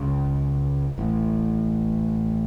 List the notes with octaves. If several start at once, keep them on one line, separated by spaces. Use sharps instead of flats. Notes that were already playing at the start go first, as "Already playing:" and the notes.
Already playing: C#2 C#3
A1 A2